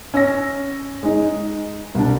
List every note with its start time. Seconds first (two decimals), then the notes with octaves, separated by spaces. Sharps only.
0.14 C#4 E6 A#6
1.03 G#3 D#4
1.95 C2 D4